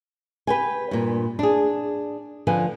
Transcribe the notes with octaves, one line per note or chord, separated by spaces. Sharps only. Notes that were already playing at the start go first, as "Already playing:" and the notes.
G4 B4 G5 G#5
G2 A#2
D4 G#4
D3 F3 B4 G#5